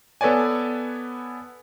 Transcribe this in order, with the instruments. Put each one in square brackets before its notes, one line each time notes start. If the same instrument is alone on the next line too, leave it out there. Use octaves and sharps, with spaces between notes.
[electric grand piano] B3 A4 B4 C#5 D5 G#5